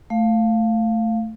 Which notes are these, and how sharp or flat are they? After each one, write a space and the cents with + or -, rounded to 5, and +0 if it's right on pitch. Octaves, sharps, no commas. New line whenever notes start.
A3 +0 F5 +0